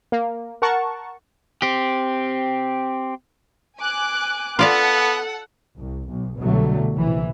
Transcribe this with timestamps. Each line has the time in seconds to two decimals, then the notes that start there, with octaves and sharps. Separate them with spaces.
0.12 A#3
0.62 A#4 F#5 A5 C#6
1.62 C4 G4
3.78 G#5 D6 F#6
4.59 B3 F4 A4 D5 F5 F#5
5.76 C2
6.09 B1
6.40 C2 B2 D3 F#3 G3 A3
6.94 A#1 C3 E3